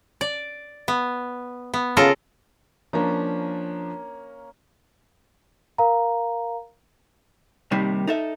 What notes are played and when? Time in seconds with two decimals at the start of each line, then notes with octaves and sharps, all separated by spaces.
0.21 D5
0.88 B3
1.74 B3
1.97 C#3 F4 A4 A#4
2.93 F3 A#3 C#4 D4 A#5
5.78 A#4 F5 A#5
7.71 D#2 C3 D#3 G3 A#3
8.08 D#4 A4 E5